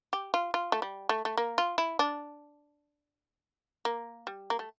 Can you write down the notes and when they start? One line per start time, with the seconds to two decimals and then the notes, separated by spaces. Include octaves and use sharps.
0.13 G4
0.34 F4
0.54 F4
0.72 A3
0.82 G3
1.09 A3
1.25 A3
1.37 A#3
1.58 F4
1.78 E4
1.99 D4
3.85 A#3
4.27 G3
4.50 A#3
4.59 A3